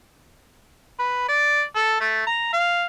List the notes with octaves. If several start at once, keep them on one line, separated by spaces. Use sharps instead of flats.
B4
D5
A4
A3
A#5
F5